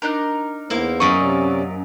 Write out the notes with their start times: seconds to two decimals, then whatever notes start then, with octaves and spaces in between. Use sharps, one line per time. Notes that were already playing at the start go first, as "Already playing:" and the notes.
0.02 D4 D#4 A#4
0.70 E2 A#3 B3 E4 C5
1.00 F#2 D#4 C#6
1.19 C3 C#4 D5